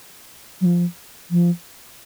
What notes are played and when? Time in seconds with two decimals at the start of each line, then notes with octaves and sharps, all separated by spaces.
0.61 F#3
0.65 F3
1.31 F3